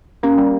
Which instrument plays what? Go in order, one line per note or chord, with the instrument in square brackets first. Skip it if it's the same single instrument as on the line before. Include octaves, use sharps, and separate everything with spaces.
[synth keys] A#3 [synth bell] C#4
[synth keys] G3